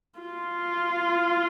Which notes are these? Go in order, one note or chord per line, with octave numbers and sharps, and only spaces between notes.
F4